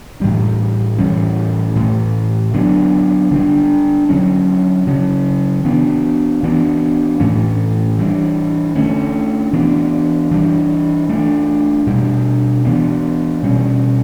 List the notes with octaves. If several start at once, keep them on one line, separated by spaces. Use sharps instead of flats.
A2 E3 G3 D4
A2 E3 G3 C#4
A2 E3 A3
D3 F#3 B3 D4
D3 G3 D4
D3 F#3 C#4
C#3 F#3 C#4
E3 B3 D4
E3 B3 D4
A2 E3 A3 C#4
E3 G3 D4
D3 A3 C#4
E3 B3 D4
E3 G3 D4
E3 A3 D4
B2 G3 D4
E3 B3 D4
B2 G3 C#4